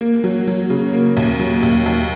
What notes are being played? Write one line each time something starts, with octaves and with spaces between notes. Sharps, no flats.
A#3
F#3
F#3
C#3
A#3
D#2
F#3
D#2
D#2